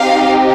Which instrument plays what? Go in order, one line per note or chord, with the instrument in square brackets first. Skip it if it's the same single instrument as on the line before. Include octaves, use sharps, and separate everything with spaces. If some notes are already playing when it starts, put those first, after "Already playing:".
Already playing: [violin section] C4 D#4 G4 F5